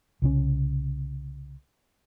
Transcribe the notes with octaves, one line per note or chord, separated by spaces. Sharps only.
C2 C#3 C#4